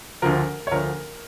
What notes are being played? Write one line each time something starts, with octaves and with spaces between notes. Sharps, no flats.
D2 D3 F3 A#4
C#5
D2 D3 F3 A#4